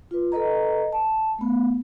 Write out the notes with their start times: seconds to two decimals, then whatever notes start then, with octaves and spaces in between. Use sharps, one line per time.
0.11 F4 B4
0.32 A4 B4 D#5 A#5
0.92 A5
1.39 A3 B3